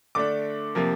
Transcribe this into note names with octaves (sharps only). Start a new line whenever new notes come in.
D3 A3 D4 D6
C3 F3 A#3